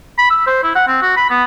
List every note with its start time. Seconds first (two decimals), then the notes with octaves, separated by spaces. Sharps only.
0.18 B5
0.30 E6
0.47 C5
0.64 E4
0.76 F#5
0.87 C4
1.02 F#4
1.17 B5
1.30 B3